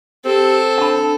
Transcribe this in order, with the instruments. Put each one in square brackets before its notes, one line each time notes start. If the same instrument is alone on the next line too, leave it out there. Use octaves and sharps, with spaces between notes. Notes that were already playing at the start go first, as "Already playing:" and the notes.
[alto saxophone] C4 [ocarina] G4 [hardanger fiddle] A4
[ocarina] D4 [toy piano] A5 B5